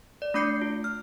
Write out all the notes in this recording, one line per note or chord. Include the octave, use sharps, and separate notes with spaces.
D5
A3 D4 D6 G6 C7 C#7
F4
F6